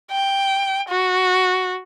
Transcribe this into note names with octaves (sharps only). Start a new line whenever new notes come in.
G5
F#4